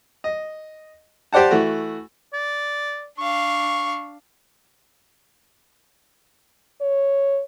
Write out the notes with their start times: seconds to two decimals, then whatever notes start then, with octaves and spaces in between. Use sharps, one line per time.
0.24 D#5
1.33 G4 C5 D5 F#5 A5
1.51 E3 A3 F#4
2.33 D5
3.18 D4 F5 C#6
6.81 C#5